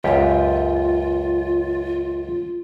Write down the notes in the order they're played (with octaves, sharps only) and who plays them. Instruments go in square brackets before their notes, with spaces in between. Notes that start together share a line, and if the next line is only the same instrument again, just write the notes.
[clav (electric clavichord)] C#2 F#2 G4 [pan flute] F4